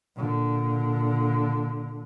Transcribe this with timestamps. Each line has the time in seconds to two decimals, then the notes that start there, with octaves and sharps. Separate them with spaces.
0.16 A#2 D3